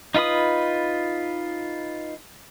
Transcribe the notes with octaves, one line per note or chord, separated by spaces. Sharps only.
D#4 F4 B4 B5 D#6